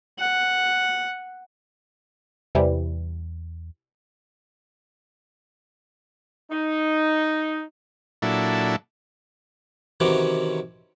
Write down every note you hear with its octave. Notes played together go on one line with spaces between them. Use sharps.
F#5
E2 C3 E3 G3
D#4
A#2 F#3 D4 E4 A4
C3 D#3 E3 F#3 C#4 D6